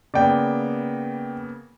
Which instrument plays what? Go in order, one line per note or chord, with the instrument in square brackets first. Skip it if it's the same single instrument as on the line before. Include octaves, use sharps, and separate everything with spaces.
[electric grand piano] C#3 A#3 B3 [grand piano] D5 G5